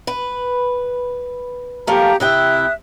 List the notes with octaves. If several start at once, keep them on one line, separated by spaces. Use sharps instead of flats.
B4
F3 A3 A#3 G4 A#5
C3 E4 E5 G5 D#6 F#6